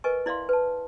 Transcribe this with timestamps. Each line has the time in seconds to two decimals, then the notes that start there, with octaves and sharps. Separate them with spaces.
0.04 A#4 B4 D#5 G#5 C#6
0.26 E4 D5 E5 F5 C6
0.49 B4 A5